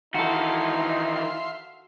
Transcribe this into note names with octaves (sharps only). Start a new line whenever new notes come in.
D#3 E3 D#4 F#4 A4 E5 F5 C6